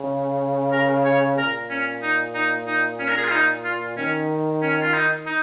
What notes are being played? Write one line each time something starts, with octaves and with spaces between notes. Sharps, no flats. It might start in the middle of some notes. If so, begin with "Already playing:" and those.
Already playing: C#3
A#4
C#5
A#2 A#4
C#4
D#4
D#4
D#4
C#4
A#4
G#4
F4
D#4
F4
D#3 C#4
C#4
F4
D#4
D#4